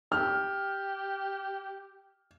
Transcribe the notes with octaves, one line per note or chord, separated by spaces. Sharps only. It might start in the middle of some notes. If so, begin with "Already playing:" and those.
G4 F6